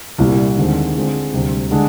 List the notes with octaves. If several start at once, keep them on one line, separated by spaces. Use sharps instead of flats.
C2 A#2 G3
D#2 D3 G#3 C4
D3 G#3 C4 F4
D2 C3 G3
D3 G#3 D4